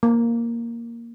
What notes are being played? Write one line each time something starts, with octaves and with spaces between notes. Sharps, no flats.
A#3